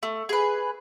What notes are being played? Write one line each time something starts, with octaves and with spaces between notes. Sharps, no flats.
A3
G#4 B4